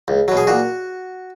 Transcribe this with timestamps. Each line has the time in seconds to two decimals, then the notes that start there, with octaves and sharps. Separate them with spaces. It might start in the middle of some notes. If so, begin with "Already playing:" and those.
0.08 C#2
0.28 B2 F#3
0.37 G#4
0.47 A#2 F#4